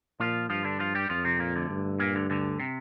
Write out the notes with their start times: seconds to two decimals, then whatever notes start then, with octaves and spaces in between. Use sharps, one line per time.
0.19 A#2 F3 F4
0.50 G2 F3 F4
0.64 D3 D4
0.79 F3 F4
0.95 G3 G4
1.09 F2 F3 F4
1.25 C3 C4
1.39 A#2 A#3
1.55 D2 D3
1.70 G2
1.99 A#2 A#3
2.15 D2 D3
2.30 D2 D3
2.59 C3